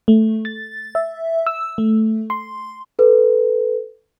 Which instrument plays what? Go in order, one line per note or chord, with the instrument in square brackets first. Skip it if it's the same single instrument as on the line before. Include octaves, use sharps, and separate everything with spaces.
[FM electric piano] A3
A6
E5
E6
A3
C6
[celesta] A4 B4